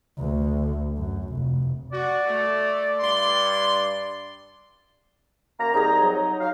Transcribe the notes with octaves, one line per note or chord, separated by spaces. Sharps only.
D2
F#2
F1
F#4 D5
A3
G2 C6
F#2 A#3 A#5
C2 D#4 G#4 A#5
F#3
F#3 F5